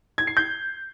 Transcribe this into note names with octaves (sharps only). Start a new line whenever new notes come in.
G#6
C7
G6